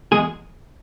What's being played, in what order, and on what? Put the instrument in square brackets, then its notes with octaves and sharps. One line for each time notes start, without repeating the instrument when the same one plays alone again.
[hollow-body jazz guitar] E2 G#3 G#4